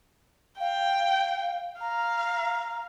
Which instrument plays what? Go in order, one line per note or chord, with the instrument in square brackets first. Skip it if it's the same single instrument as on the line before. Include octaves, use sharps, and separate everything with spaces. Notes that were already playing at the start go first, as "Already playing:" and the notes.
[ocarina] F5 [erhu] G5
[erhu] F5 [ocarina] A#5